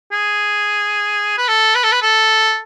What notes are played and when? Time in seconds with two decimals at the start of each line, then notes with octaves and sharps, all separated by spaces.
0.12 G#4
1.38 B4
1.48 A4
1.75 B4
1.84 A4
1.92 B4
2.02 A4